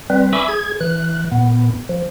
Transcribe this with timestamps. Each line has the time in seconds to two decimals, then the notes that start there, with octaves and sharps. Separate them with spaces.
0.10 G3 C4 B4
0.33 E5 G#5 B5 C#6 D6 E6
0.48 G#4 G#6
0.81 E3 F#6
1.32 A#2 B3
1.89 F3